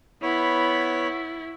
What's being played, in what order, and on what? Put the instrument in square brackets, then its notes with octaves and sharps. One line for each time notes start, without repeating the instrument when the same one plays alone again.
[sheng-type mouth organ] B3 C#5 B5 [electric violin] E4